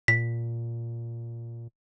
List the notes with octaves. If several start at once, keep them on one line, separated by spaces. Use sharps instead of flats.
A#2 B6